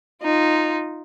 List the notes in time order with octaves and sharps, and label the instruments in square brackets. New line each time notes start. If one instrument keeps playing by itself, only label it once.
[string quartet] D#4 F4